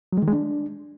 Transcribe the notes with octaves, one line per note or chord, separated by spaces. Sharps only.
F#3
G#3
D#3
G#3
D4